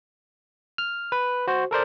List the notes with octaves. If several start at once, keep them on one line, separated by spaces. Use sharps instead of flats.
F6
B4
F#4 C5
A4 A#4 C5 D5